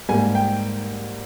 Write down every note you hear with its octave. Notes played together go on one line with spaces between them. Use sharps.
G#2 G3 A#3 G#5
G5